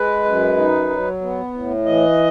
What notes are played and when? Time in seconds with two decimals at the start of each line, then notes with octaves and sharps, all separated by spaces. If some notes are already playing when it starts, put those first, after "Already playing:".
Already playing: G#3 B4
0.25 F#2
0.57 D#4
0.90 F#3
1.21 B3
1.53 A2
1.85 E3 D#5